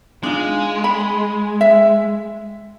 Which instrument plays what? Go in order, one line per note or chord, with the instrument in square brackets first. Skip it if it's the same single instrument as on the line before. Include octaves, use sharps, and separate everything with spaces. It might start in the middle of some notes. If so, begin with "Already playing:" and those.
[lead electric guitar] G#3 [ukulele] D4 D#4 F4
[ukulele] B5
E5